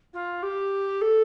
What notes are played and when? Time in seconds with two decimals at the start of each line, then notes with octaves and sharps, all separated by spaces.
0.14 F4
0.43 G4
1.01 A4